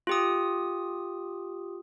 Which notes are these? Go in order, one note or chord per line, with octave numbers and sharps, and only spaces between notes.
F4 G4 D#6